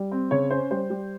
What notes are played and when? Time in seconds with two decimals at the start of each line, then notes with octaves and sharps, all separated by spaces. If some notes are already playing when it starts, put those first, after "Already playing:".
Already playing: G3
0.11 C4
0.31 C#3 C#5
0.50 C#4 C5
0.71 G3 C5
0.90 G3